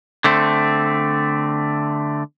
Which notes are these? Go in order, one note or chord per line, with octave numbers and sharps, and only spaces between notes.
D3 A3 C4